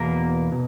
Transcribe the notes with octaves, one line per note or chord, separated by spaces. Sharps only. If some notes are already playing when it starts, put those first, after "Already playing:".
Already playing: E2 B2 A#3 A#4
B2